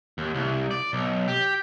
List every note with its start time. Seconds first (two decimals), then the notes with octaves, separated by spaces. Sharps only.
0.18 D#2
0.35 C2
0.71 D5
0.93 B1
1.28 G4